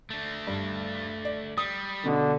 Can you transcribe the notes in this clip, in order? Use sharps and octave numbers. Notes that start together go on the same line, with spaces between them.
A3 D4
G2
D5
G3 D#6
B2 D3